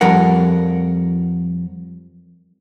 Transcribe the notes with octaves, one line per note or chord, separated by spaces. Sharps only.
F2 F3 G3 A#4 F#5